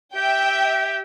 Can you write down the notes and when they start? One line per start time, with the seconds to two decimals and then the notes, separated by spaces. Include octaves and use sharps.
0.15 G4 E5 G5